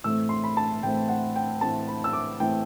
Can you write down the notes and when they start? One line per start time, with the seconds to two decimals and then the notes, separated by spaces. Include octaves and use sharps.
0.04 A2 E3 A3 C4 E6
0.29 C6
0.44 B5
0.57 A5
0.82 A2 E3 A3 C4 G5
1.09 F#5
1.36 G5
1.61 A2 E3 A3 C4 A5
1.88 B5
2.04 E6
2.13 D6
2.40 A2 E3 A3 C4 G5